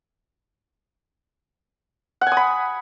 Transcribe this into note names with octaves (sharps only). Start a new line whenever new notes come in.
F#5
G#5
D#6
B5